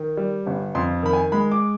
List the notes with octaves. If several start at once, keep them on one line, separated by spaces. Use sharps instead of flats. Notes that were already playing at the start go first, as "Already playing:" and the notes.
Already playing: D#3
G3
G1
F2 C6
D#3 B5
G#5
G#3 B5
D6